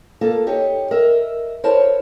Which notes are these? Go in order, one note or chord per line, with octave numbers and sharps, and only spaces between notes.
A#3 F4 A4
D#4 G4 C#5
A#4 D#5 E5
E4 A#4 C5 C#5 A5